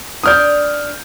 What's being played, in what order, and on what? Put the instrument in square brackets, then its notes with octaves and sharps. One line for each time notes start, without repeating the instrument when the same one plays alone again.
[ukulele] D4 D5 [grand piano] D#6 F6 G6